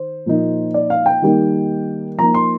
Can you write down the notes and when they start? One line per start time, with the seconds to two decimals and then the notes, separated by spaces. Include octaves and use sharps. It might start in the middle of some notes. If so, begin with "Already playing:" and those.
Already playing: D#3 C5
0.26 A#2 F3 A#3 D#4
0.74 D5
0.90 F5
1.06 G5
1.22 D#3 G3 A#3 D#4
2.18 F3 A#3 D#4 A#5
2.34 C6